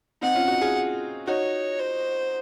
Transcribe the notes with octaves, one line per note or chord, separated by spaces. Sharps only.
C4 D#4 F#5
C#4 F4
D#4 F#4
F4 G#4
D#4 F#4 C#5
C5